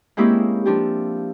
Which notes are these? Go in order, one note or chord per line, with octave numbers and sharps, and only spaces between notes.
G#3 A#3 C4 C#4 E4 G4
F3 D4 G4